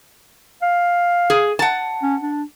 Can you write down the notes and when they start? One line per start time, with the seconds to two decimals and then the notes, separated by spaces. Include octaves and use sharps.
0.62 F5
1.30 G#4
1.59 F#5 A5
2.03 C#4
2.22 D4